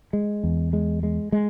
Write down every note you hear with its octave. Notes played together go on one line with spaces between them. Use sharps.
G#3
E2
G#3
G#3
G#3